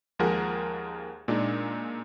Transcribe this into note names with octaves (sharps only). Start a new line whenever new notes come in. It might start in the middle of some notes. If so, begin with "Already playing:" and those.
D#2 F3 G#3 G#4 A#4 F#5
A#2 G#3 D4 D#4